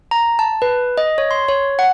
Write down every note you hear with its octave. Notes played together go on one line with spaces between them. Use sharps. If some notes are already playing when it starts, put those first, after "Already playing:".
A#5
A5
B4
D#5
C#5
C6
C#5
F#5